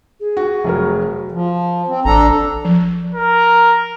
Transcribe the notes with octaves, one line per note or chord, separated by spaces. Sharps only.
G#4
F#4
F1 F#3 A#4
F3
C4
A1 D4 A4 A#5
F3
A#4